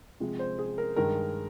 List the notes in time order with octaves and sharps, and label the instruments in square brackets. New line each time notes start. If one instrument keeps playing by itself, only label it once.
[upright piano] C3 F3 G#3
C5
G#4
A#4
G2 D#3 G#3 A#4